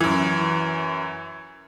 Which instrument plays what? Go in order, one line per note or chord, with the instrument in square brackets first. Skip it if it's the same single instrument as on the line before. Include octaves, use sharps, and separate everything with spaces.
[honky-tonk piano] F#2 E3